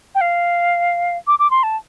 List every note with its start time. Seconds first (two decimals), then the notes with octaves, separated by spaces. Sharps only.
0.15 G5
0.21 F5
1.27 D6
1.39 D6
1.51 C6
1.63 A5